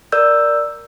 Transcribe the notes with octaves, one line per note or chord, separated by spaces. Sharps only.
A#4 D5 E6 G6